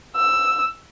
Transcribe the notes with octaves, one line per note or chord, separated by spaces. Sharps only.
E6